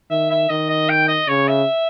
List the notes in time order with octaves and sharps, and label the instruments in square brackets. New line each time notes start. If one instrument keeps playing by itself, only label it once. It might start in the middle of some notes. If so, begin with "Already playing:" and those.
[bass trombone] D#3 [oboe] E5
[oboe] E5
[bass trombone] D#3 [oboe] D#5
[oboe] D#5
G5
D#5
[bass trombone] C#3 [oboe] C#5
[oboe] E5